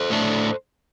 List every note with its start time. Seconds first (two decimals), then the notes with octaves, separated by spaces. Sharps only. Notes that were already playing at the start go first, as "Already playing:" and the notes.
Already playing: A4 C5
0.10 A2 A3 D4